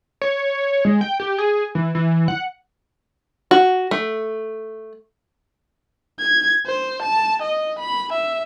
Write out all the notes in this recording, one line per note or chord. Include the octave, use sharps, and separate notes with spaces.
C#5
G#3
G5
G4
G#4
E3
E3
F#5
F#4
A3
G#6
C5
A5
D#5
B5
E5